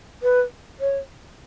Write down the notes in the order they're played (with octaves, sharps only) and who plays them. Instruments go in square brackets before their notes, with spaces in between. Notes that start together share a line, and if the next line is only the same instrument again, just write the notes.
[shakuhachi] B4
C#5